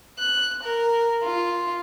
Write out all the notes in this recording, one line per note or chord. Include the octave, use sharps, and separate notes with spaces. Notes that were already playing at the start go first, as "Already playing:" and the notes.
F#6
A#4
F4